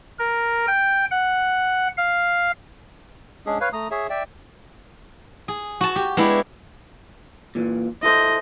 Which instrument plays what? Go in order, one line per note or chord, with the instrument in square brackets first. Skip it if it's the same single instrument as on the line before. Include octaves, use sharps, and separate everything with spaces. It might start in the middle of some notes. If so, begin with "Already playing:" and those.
[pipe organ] A#4
G5
F#5
F5
[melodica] G#3 C#4 D4 G#4
B4 C#5 F5
A3 A#5 D#6
G#4 C#5 E5
D5 E5 G5
[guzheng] G#4
F#4 A5
G4
G#3 B3 D4 E4 G4
[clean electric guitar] A#2 E3
[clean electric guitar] E4 A4 C5 [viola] D#5